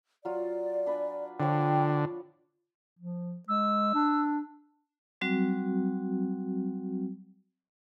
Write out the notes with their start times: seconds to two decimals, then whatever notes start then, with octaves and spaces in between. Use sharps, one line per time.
0.25 F#3 F4 D5
0.86 D4 B4 G#5
1.40 D3 F3 D4 C#5 G5
2.99 F3
3.48 G#3 E6
3.94 D4
5.21 F#3 G3 C4 F#4